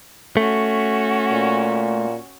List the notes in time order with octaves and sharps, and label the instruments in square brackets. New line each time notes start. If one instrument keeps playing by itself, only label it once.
[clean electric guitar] A3 [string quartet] C#4 F#4
[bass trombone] A#2